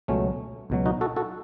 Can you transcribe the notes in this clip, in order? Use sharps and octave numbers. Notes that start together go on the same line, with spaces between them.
C#2 B2 F#3 A3 C#4
C#2 B2 F#3
D#4 F#4
F#4 A4
F#4 A4